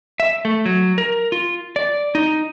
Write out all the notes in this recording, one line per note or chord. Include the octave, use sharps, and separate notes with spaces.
E5
A3
F#3
A#4
F4
D5
D#4